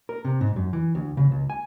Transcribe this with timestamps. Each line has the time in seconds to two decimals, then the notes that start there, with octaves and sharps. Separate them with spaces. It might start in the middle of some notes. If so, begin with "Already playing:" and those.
0.09 A#4
0.25 C3
0.41 G#2
0.56 F#2
0.73 E3
0.95 D2
1.17 C#3
1.31 C#2
1.50 G#5